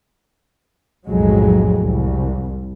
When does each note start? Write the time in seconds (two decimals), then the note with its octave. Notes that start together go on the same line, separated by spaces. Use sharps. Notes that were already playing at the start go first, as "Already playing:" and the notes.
1.06 B1 F2 A2 F#3 G#3
1.78 C2